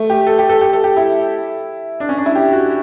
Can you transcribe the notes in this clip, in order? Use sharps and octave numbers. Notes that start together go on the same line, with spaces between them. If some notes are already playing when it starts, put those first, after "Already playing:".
Already playing: A3
G4
A4
G4
A4
G4
A4
G4
E4
D4
C#4
D4
E4
G4
F#4